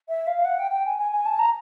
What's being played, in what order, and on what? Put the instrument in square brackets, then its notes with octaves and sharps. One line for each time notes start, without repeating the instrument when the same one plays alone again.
[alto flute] E5
F5
F#5
G5
G5
G#5
G#5
G#5
A5
A#5